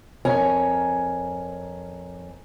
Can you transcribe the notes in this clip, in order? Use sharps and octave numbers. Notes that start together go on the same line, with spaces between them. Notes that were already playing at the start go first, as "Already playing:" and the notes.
F2 A#4 C#5 G#5 A#5